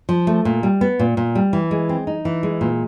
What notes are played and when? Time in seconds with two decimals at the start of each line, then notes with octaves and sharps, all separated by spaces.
0.09 F3
0.27 A3
0.45 A#2
0.63 G3
0.81 B3
0.99 A#2
1.17 A#2
1.35 G3
1.53 E3
1.71 G#3
1.89 C4
2.07 D#4
2.25 E3
2.43 G#3
2.61 A#2